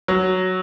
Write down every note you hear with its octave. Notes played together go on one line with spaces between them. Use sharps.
F#3